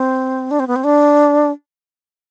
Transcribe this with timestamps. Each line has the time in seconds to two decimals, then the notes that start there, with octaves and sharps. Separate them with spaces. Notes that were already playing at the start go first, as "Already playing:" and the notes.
Already playing: C4
0.51 D4
0.60 C4
0.68 B3
0.76 C4
0.84 D4